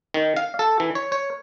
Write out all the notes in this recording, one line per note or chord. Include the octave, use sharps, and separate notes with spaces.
D#3
F5
A4
E3
C#5
C#5